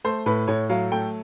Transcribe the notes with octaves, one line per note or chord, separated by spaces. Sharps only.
A3 C5
A2 B4
A2 C#5
F#3 F5
A3 G5